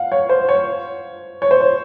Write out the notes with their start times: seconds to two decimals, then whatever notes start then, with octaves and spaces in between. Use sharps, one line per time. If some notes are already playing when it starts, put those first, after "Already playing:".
Already playing: F5 F#5
0.12 C#5
0.29 C5
0.49 C#5
1.42 C#5
1.51 C5
1.61 C#5